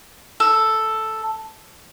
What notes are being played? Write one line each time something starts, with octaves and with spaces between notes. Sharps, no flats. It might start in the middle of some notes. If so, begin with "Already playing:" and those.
A4